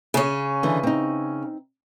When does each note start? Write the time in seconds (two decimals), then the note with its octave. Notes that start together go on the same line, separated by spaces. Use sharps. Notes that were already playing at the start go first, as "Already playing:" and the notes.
0.14 C#3 C#4
0.63 D3 E3
0.83 C4 D#4